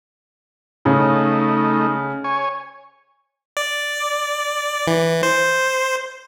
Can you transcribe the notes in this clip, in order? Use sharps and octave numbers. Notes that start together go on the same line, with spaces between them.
C#3 A3 D#4
C#5 G#5
D5
E3
C5